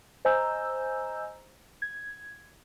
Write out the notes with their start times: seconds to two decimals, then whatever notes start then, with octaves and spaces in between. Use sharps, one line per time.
0.25 C5 D#5 G#5 A#5 E6 G6
1.82 G#6